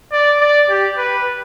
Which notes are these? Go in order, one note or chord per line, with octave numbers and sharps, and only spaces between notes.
D5
D5
G4
B4